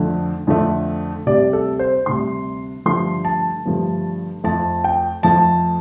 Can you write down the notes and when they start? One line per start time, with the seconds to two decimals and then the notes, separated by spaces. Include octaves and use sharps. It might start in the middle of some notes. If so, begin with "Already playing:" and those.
Already playing: F2 D3 F3 A3
0.47 F2 D3 F3 A3
1.26 D2 C3 G3 D5
1.53 A4
1.79 C5
2.06 D2 C3 G3 C6
2.86 G2 D3 F3 A3 C6
3.25 A5
3.65 G2 D3 F3 A3
4.44 F2 F3 A3 A5
4.84 G5
5.23 F2 F3 A3 A5